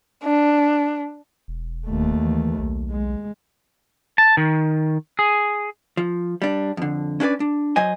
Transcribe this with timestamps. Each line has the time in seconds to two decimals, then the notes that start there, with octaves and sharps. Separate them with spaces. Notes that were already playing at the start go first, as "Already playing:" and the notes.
0.23 D4
1.48 E1
1.87 D#2 A3
2.24 E3
2.59 B1
2.91 G#3
4.18 A5
4.37 D#3
5.19 G#4
5.97 F3
6.42 G3 D4
6.77 F2 D3
7.20 C#4 D4 G4 B4 D5
7.40 D4
7.76 F#3 C5 D#5 G#5